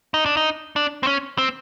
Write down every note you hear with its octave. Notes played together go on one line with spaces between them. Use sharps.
D#4
D4
D#4
D4
C4
C#4
C4